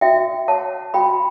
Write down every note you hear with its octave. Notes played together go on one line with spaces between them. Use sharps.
F#4 E5 G5
C#5 F#5 A5
F#4 G5 B5